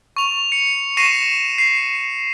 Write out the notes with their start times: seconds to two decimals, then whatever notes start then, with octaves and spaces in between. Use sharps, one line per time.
0.17 C#6 F7
0.52 C#7
0.97 C#6 A#6 C7 D#7 E7
1.58 C7